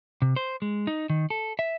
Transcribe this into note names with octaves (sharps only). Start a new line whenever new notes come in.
C3
C5
G#3
D#4
D#3
A4
E5